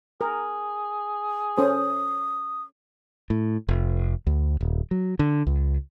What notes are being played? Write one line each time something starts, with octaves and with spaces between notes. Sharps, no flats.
G#4 A#4
C#4 A4 C5 D#6
A2
F1
D2
D#1
F#3
D3
C#2